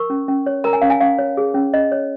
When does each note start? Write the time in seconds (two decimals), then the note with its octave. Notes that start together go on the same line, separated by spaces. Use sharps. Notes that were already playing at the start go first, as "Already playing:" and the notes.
Already playing: A#4 C#6
0.10 C#4
0.28 C#4
0.46 C#5
0.64 A#4 A#5
0.73 G#5
0.81 C#4 F5
0.90 G#5
1.00 C#4 F5
1.18 C#5
1.37 G#4
1.54 C#4
1.74 C#4 D#5
1.92 C#5